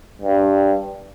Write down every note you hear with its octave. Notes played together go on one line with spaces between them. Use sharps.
G2